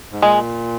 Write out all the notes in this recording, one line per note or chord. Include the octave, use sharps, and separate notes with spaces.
G#2
A#2 G#3